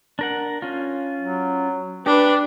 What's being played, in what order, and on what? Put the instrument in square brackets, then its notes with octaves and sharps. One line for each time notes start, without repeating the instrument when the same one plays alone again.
[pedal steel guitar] D4 A#4 F#5
C#4 F4
[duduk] F#3
[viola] D4 [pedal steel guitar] G4 [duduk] B4